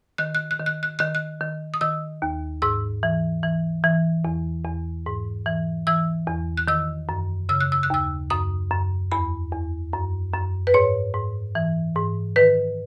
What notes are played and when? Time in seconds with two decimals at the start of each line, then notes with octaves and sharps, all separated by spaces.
0.18 D#3 F#6
0.35 F#6
0.51 F#6
0.59 D#3
0.66 F#6
0.83 F#6
0.99 D#3 F#6
1.15 F#6
1.41 D#3
1.74 D#6
1.81 D#3 E6
2.22 D#2
2.62 G#2 E6
3.03 E3
3.43 E3
3.84 E3
4.25 E2
4.65 E2
5.06 G#2
5.46 E3
5.87 E3 E6
6.27 E2
6.57 F#6
6.68 D#3 E6
7.09 F#2
7.49 C#3 E6
7.61 F#6
7.72 E6
7.83 F#6
7.90 D#2 E6
8.30 F#2 D#6
8.71 F#2
9.12 E2 B5
9.52 E2
9.93 F#2
10.34 F#2
10.67 B4
10.74 G#2 C#5
11.14 G#2
11.55 E3
11.95 G#2
12.36 D#3 B4